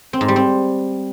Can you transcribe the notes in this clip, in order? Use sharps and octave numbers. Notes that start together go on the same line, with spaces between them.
C4
G#2
G3
C4